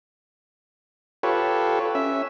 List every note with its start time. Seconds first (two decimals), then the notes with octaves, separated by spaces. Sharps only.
1.23 F4 G4 A4 B4 C#5
1.95 C#4 E5